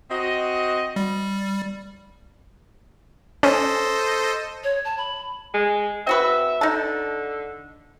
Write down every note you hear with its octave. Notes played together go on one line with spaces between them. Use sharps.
C4 F#4 D#5
G3
C#4 A4 C5 D#5
C#5
A5
B5
G#3
C4 F#4 B4 E5
D3 D#4 A5